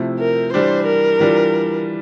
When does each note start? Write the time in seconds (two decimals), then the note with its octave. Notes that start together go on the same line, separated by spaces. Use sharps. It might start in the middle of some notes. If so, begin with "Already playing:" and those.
Already playing: C3 F3 A3 C4 E4
0.19 A#4
0.53 E3 G3 D4 C5
0.86 A#4
1.20 E3 G3 D4 F4